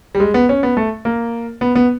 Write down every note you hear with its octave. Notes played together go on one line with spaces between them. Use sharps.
G3
G#3
B3
C#4
B3
A3
A#3
B3
B3